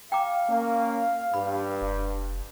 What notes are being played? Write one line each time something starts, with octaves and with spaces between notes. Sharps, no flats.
F5 G5 A#5 D6
A#3 C#4
G2 B5
F1